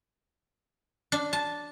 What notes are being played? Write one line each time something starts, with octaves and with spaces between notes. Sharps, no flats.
D4
A5